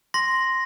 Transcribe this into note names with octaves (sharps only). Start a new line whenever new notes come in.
C6 A#6